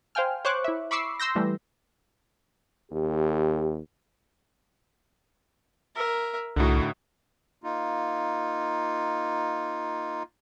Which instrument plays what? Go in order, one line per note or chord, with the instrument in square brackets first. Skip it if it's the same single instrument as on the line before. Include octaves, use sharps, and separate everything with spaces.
[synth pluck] C5 F5 G5 G#5 F6
C5 C#5 C#6 D6 F#6
E4 E5
B5 C#6 D6 E6 C7
C6 E6 G6 A#6
E3 G3 A3
[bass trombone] D#2 [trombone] G4
[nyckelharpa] A#4 E5
[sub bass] C2 [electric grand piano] A2 D3 [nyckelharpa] D#4 F#4
[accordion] A#3 D#4 F4